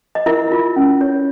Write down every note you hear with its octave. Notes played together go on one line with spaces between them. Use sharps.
D#5
E4 A#4 E5
F4
C#4
C#5